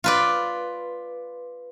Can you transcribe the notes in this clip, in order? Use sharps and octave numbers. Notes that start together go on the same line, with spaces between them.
F4 B4 D5